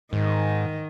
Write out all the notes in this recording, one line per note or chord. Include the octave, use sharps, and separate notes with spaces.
G#2 D#3